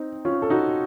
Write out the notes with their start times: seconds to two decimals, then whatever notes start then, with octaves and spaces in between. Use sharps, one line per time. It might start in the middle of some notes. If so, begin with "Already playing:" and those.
Already playing: C4 D#4
0.25 C#4 F4
0.42 A4
0.50 D#4 F#4